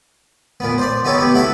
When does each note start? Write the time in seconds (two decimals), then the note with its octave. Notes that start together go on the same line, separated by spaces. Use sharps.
0.60 A#2 B3
0.78 C5 D5
1.05 B3 D#4 G4 A4 C#5
1.19 B3 G4
1.34 E4 F#4 A4 E5